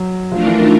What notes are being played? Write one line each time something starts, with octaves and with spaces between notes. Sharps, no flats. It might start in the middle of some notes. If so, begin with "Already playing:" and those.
Already playing: F#3
F3 A3 D4 F4 A#4
E3
D#3